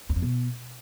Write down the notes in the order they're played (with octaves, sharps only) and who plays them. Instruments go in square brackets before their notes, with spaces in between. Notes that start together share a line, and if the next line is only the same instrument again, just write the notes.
[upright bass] E2
F2
B2